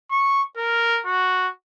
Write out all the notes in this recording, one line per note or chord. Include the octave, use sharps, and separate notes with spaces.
C#6
A#4
F#4